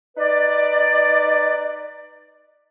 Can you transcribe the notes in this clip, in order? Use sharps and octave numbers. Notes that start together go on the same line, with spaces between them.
D#4 B4 D5